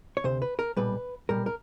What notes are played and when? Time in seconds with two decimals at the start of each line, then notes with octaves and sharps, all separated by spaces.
0.17 C#5
0.24 D2 C3 C5
0.42 B4
0.59 A#4
0.77 B1 A#2 G3 B4
1.29 B1 A#2 G3 A#4
1.46 A#4